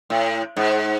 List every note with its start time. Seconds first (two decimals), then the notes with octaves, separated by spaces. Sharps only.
0.10 A2
0.57 G#2